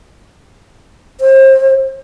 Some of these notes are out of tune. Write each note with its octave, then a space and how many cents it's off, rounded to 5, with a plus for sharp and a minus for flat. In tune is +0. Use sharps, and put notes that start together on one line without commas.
C5 +35